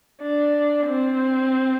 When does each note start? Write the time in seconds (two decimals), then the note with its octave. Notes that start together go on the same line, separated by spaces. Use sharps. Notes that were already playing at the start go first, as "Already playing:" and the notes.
0.23 D4
0.87 C4